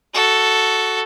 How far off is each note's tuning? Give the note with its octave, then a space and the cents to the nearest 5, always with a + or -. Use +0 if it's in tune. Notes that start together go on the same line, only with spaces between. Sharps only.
F#4 +5 A4 +0